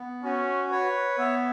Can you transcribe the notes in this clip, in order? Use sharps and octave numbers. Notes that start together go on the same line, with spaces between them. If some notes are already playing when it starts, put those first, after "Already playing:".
Already playing: B3
C#4 F#4
B4 C#5
B3 E5